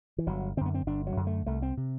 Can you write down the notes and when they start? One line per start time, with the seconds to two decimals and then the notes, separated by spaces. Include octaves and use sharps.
0.18 E3
0.27 G1 F#3
0.57 D3 C4
0.61 F#2 B3
0.74 C4
0.87 G1 D4
1.07 F#3
1.17 F#2 D3
1.27 A3
1.46 C2 A3
1.62 C4
1.77 C3